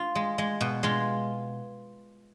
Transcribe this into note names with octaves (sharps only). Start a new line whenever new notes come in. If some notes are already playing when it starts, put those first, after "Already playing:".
Already playing: F4
G#3
G#3
B2
G#3 F4